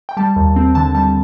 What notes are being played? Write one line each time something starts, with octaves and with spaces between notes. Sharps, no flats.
G5
G3 A5
D#2
C4
D3 A5
G3 A5